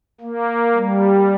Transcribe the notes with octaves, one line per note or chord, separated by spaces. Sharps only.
A#3
G3